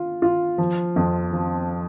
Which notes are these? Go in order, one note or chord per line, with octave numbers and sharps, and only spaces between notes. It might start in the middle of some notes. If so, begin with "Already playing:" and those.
Already playing: F4
F4
F3
F2
F3